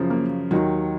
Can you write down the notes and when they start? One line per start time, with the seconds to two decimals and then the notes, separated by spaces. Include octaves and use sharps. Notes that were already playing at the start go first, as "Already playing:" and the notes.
Already playing: F#2 C#3 F3
0.10 A#3
0.51 D#2 D#3 F#3